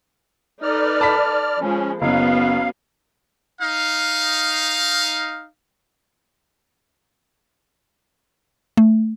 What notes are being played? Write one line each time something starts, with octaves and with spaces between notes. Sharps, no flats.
D#4 A4 B4 D5 F6
A5 B5 B6
F3 G#3 C#4
F#1 B3 C#4 F#4 F5
D#4 F5
A3